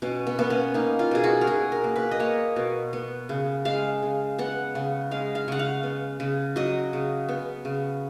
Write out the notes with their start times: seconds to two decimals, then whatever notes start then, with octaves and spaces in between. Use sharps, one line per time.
0.02 B2 C#4
0.27 B3
0.39 A#3 B3
0.50 C#4
0.74 A#3 D#4
0.99 F4
1.11 B2 G#4
1.24 F#4
1.41 A#4
1.47 B2 G#4
1.72 A#4
1.84 A#3
1.96 B4
2.11 D#5
2.20 A#3 C#5
2.56 B2
2.93 B3
3.29 C#3
3.65 G#3 F5
4.03 C#3
4.38 B3 F#5
4.75 C#3
5.11 G#3 F5
5.35 F5
5.48 C#3 F#5
5.59 F5
5.83 B3
6.20 C#3
6.56 F#3 D#5
6.93 C#3
7.29 B3
7.65 C#3